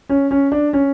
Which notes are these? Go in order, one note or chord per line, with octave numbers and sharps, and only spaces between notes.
C#4
C#4
D4
C#4